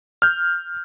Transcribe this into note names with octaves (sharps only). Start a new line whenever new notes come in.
F6 G6